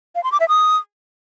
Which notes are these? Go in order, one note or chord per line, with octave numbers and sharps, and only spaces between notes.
F5
C6
D6
E5
D#6